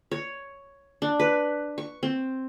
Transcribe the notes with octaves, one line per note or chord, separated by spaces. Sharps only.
C#5
D4
B4
C#6
C4